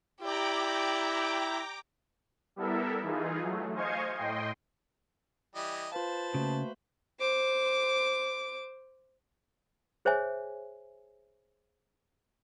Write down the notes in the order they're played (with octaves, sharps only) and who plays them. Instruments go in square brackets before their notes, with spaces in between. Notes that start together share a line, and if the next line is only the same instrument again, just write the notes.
[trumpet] E4 [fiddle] G4 D5 [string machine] G5 A#5 D6
[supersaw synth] G3 B3 E4 A4 A#4 E5
E3 D#4 F4 G#4
F#3 A3
C5 D#5 F5 G#5 C#6 G#6
A2 D#5 G5 C6
[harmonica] E3 G3 D#5
[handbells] F4 F5 [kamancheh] B4 C5 [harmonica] A5
[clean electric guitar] C#3 [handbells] A3 A#3 F#4
[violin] C5 D6
[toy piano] G#4 C5 C#5 E5 G#5